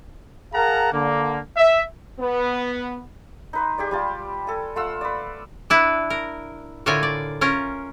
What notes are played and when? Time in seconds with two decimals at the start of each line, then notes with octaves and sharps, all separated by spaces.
0.53 G#4 A#4 F5 F#5 A5 A#5
0.93 D3 A#3
1.56 E5
2.19 B3
3.53 D#4 B4 C6
3.78 G4 G#4 D5
3.91 G3 F4 A5
4.47 A4 G#5
4.76 A3 F4 F#5 E6
5.01 B4 D5
5.70 D4 E4 B4
6.10 A#4
6.86 A2 D3 F4 A#4 C#5 G#5
7.03 D5
7.41 C#4 F4 A#4